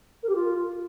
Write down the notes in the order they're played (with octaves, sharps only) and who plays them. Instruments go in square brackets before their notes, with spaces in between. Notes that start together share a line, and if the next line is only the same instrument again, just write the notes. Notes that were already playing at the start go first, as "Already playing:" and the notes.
[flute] A#4
G4
F4